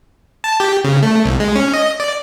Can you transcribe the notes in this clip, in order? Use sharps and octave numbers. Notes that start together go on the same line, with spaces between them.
A5
G4
C#3
A3
C2
G#3
C#4
D#5
D5